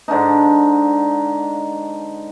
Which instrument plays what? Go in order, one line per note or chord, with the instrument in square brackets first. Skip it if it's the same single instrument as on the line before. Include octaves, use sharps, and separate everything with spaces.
[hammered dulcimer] G#2 D3 D4 D#4